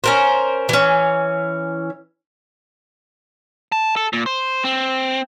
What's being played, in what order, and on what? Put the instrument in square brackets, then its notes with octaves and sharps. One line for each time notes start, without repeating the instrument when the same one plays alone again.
[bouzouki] C#4 A#4 C5
E3 C#4
[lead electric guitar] A5
A4
A#2
C5
C4